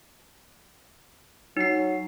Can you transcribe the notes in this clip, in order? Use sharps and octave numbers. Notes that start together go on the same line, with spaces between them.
F#3 D#4 C7